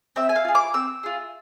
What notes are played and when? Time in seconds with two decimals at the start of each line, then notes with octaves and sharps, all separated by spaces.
0.16 C4 E5
0.29 G#5
0.36 F5
0.45 F4 G#4
0.55 D6
0.74 C4 E6
1.03 F4 G#4